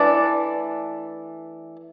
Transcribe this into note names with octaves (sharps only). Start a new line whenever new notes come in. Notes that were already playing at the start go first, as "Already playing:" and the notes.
Already playing: E3 A3 D4 D5